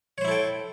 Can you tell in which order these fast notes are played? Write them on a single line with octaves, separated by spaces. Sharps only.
C#5 C5 E4 A4 G5